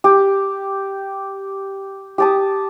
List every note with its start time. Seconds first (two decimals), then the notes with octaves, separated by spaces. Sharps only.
0.04 G4
2.18 G4 A5 D#6